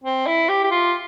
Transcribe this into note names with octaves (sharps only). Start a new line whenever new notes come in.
C4
E4
G4
G4
F4